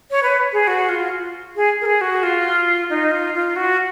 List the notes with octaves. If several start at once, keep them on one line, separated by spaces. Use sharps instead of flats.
C#5
B4
G#4
F#4
F4
G#4
A#4
G#4
F#4
F4
D#4
F4
F4
F#4